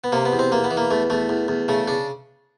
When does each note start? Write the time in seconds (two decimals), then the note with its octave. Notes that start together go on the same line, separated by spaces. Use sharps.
0.04 B3
0.12 C3 A#3
0.25 B3
0.32 E2
0.39 C4
0.52 E2 A#3
0.64 B3
0.71 E3
0.77 A#3
0.91 E2 A3
1.10 E2 A3
1.29 E2
1.48 E2
1.68 C#3 A3
1.88 C#3 D4